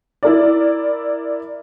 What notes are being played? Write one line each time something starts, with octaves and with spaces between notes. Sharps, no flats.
E4 A#4 D5